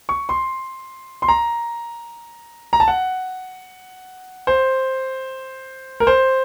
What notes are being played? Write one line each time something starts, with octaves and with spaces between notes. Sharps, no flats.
C#6
C6
C6
A#5
A#5
A5
F#5
C5
A#4
C5